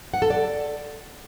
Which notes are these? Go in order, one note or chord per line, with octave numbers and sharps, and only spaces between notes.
F#5
A4
D5